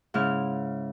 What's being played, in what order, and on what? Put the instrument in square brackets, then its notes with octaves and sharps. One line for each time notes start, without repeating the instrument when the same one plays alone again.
[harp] G#2 C#3 E4 F6